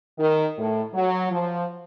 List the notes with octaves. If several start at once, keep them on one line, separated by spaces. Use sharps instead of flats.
D#3
A2
F#3
F3